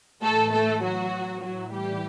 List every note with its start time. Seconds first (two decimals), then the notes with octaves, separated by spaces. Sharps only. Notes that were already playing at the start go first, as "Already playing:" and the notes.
0.23 A2 E3 A3 A4
0.53 A3 A4
0.83 F#3 F#4
1.42 A2 E3 F#3 F#4
1.72 G3 G4